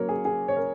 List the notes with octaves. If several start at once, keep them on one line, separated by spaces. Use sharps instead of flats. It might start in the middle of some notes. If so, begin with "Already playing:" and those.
Already playing: C#3 F#3 A#3 A#4 C#5
G#4
G#4
C#5
A#4